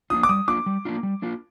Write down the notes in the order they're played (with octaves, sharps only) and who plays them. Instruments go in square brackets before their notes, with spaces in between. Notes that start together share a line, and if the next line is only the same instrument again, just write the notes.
[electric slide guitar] A#3 D4 F4 [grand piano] D#6
[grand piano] D6
[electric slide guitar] G3 [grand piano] D#6
[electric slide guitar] A#3 D4 F4 [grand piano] D6
[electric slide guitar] G3
A#3 D4 F4
G3
A#3 D4 F4